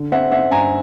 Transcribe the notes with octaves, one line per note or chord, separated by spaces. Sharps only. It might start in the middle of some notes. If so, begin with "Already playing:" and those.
Already playing: D3
C4 E5 F#5
C4 E5 F#5
G2 G#5 A#5